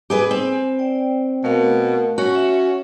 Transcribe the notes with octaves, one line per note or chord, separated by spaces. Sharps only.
G4 G#4 B4 G#5
C4
D5 G5
B2 A3 A#4 F5
C#4 F#4
E5